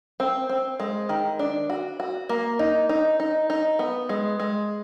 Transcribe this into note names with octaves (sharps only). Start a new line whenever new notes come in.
C4
C4
G#3
D#3
D4
F#4
F#4
A#3
D#4
D#4
D#4
D#4
B3
G#3
G#3